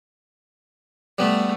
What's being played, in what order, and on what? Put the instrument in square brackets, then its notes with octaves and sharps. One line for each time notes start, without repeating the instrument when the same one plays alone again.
[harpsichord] G3 B3 [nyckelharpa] A3